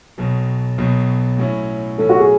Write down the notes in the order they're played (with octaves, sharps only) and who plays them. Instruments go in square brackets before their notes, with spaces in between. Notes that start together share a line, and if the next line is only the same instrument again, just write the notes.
[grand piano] B1 B2 F#3
B1 B2 F#3
A2 F#3 C#4 E4
[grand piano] A2 F#3 C#4 E4 [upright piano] A4
[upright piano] F#4
G#4